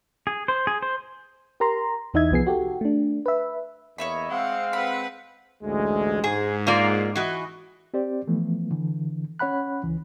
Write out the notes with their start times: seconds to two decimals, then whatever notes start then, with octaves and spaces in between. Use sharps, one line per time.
0.27 G#4
0.48 C5
0.67 G#4
0.83 C5
1.60 G4 A#4 A#5 C6
2.14 E2 E3 D#4 D#5 E5 G#6
2.31 C2 F3 B3 G#4 C7
2.47 F#4 G4 A4
2.81 A3 D4
3.26 B4 E5
3.98 E2 A#3 C#5 D#5 E5 B5
4.30 G#3 C4 F5 F#5
4.73 B4 F#5 B5
5.63 A1 D2 G#3
6.24 G#2 G#4
6.67 A#3 F4 D5
7.16 E3 F#4 D#5
7.94 C4 G4 C5 D5
8.28 E3 F3 A3 B3
8.71 D3 E3
9.39 C#4 C#5 F#5 B5 F#6
9.84 C#2 E3